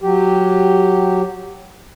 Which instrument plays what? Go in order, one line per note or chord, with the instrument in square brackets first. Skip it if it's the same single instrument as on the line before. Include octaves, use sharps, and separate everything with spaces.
[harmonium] F#3 G4